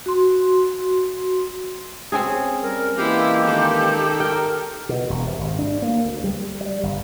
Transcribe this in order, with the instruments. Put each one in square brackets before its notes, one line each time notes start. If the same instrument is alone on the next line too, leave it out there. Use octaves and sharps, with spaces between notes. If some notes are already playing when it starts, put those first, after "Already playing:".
[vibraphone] F#4 C6
[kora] C4 C#4 G#4
[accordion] G3 [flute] A#4
[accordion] E3 G#3 A#3 [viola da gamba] E4 F4 [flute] G4
[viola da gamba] D#3 A4
[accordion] A#4 [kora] G5
[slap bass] B2
E1
C3
G#1
D4
A#3
D2
G3
G3
G1